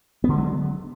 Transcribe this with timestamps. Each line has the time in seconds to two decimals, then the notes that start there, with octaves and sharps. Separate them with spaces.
0.24 B3
0.29 D3
0.33 G#3
0.38 F#3